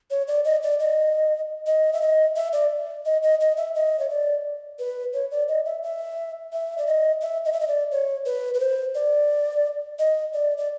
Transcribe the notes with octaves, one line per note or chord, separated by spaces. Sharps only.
C#5
D5
D#5
D5
D#5
D#5
E5
D#5
E5
D5
D#5
D#5
D#5
E5
D#5
C#5
D5
B4
C#5
D5
D#5
E5
E5
E5
D5
D#5
E5
D#5
E5
D#5
D5
C#5
B4
B4
C5
D5
D#5
D5
D5